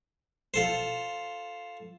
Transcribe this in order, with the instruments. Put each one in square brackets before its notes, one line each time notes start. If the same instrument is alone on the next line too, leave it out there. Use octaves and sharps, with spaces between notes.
[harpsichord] F4 A4 C5